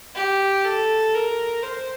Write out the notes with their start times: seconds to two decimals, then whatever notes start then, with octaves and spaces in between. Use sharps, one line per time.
0.15 G4
0.65 A4
1.14 A#4
1.62 C5